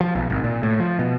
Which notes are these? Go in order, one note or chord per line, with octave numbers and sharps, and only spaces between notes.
F3
B1
G#1
A#2
A2
F3
B2